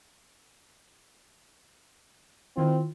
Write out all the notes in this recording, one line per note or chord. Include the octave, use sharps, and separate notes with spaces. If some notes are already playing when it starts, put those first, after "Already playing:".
D#3 C4 E4 F4